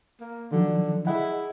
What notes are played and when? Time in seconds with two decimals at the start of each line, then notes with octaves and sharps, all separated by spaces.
0.21 A#3
0.51 D3 D#3 F3 F#3
1.07 E4 G#4 D#5 F#5